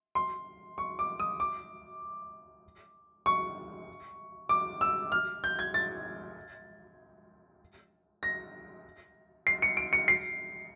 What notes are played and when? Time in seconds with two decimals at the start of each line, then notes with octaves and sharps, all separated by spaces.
0.15 C6
0.78 C#6
0.99 D6
1.20 D#6
1.40 D6
3.26 C#6
4.49 D6
4.81 E6
5.12 F6
5.44 G6
5.59 G#6
5.74 A6
8.23 A#6
9.47 C7
9.62 C#7
9.77 D7
9.93 C#7
10.08 C7